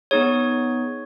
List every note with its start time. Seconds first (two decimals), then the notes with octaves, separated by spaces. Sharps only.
0.11 B3 D#4 G#4 C#5